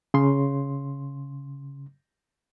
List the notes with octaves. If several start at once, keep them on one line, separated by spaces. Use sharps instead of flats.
C#3 C6